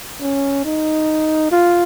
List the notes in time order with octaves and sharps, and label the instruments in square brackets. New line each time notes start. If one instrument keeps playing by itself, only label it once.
[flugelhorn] C#4
D#4
F4